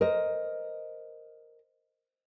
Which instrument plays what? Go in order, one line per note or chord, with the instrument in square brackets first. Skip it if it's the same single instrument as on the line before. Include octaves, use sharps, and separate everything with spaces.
[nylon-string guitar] A#4 C5 D#5